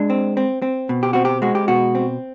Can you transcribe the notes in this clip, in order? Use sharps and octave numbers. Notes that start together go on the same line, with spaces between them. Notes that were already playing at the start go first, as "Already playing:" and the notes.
Already playing: G#3 D4
C4
C4
C4
B2
G4
C4 F#4
G4
G#3 F#4
G4
B2 F#4
C4